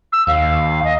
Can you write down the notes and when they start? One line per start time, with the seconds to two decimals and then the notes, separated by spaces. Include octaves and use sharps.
0.12 E6
0.27 D#2 F5
0.84 D#5